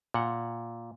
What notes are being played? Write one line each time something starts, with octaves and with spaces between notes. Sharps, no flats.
A#2 F#5